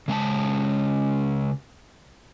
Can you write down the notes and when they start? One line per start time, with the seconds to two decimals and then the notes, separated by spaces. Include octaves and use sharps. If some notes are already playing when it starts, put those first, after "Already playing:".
0.08 C#3 G#3 G#5 A5